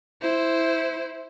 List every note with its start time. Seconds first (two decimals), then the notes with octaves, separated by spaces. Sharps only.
0.22 E4 C5